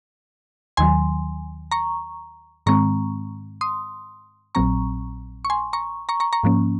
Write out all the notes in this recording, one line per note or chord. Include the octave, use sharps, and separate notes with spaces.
D#2 D#3 F#3 G#5 C6
A#5 C#6
G#2 D#3 G#3 C4 A#5 C#6
C6 D#6
A#1 A#2 F#3 C4 A#5 C#6
C#6
G#5 C6
A#5 C#6
A#5 C#6
A#5 C#6
A#5 C#6
G#2 F3 A#3 C#4